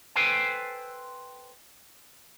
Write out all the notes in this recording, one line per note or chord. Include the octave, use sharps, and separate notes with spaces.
A4 B4 C5 G5 G#5